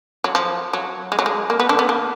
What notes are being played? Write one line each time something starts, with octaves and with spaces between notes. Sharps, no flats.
F#3
F3
F#3
G#3
F#3
G#3
A#3
B3
D3 D4
B3
A#3